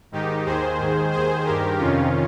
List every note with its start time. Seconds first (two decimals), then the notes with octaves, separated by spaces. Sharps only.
0.12 G#2 D#3 D#4 G4
0.45 D#2 D#3 G#4 C5
0.79 G#2 D#3
1.12 D#2 D#3 G#4 C5
1.45 G2 D#3 G4 A#4
1.78 F2 C3 D#3 C#4 F4